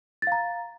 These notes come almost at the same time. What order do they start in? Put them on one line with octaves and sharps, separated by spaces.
A6 F5 A#5